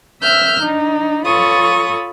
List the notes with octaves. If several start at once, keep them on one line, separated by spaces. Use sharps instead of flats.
E5 E6 F6 G6
D4 D#4
F4 A4 C#5 B5 C#6 D#6